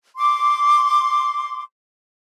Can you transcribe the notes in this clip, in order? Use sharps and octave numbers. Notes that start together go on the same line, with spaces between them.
C6 D6